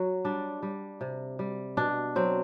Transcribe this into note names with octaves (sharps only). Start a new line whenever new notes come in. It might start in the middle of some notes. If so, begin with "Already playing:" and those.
Already playing: F#3 F#4
G3 D4
G3
C3
G3
B2 D4
F#3 C4